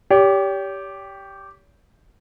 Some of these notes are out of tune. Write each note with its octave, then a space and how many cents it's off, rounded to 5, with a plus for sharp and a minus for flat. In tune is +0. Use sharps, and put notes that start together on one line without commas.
G4 +0 C#5 +45